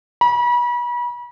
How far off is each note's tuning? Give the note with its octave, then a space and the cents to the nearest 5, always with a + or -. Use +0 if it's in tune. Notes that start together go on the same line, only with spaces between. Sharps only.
B5 -35